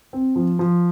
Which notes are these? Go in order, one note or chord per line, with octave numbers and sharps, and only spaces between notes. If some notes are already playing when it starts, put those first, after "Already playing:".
C4
F3
F3